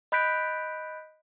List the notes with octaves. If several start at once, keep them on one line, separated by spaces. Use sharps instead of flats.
D#5 B5 F#6 G6 B6 D7